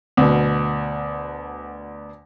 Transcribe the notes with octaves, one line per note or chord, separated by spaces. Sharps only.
D2 B2